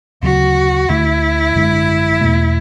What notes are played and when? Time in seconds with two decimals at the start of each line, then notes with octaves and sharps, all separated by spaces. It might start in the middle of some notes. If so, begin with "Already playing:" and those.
0.22 D2 C#3 F#3 F#4
0.89 D2 D3 A3 E4
1.55 G#1 F#2 D3 G#3
2.21 E2 B2 A3